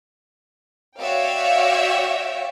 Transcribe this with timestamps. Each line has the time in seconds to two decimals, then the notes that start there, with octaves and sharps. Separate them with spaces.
0.98 F#4 C#5 D5 E5 F5 G5